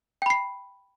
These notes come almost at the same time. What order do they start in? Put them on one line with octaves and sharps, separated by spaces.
G5 B5 C7